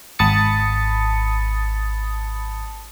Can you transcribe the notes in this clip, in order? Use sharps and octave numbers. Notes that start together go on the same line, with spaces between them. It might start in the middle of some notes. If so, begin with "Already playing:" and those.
G#1 A5 B5 D#6 A6 C#7